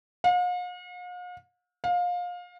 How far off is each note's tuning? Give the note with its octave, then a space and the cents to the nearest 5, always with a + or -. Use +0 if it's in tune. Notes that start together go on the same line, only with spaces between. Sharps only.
F5 +45
F5 +25